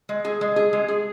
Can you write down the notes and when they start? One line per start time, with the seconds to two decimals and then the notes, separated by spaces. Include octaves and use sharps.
0.09 G#3
0.25 G#4
0.41 G#3
0.56 G#4
0.73 G#3
0.88 G#4